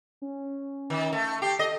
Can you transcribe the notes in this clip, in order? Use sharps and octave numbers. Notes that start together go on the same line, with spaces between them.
C#4
D#3
A3
G4 C7
A4 D#5